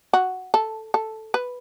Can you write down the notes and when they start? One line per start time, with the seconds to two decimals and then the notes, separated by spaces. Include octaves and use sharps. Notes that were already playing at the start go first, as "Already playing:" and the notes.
0.13 F#4
0.54 A4
0.94 A4
1.34 B4